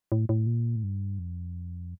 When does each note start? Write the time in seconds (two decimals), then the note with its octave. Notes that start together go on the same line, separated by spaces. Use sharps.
0.12 A2
0.29 A2
0.46 A#2
0.76 A2
0.83 G2
1.19 F2